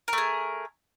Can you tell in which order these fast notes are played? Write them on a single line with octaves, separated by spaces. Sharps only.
A#4 A3 G#4